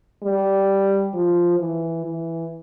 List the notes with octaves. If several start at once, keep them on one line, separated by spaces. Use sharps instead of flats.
G3
F3
E3
E3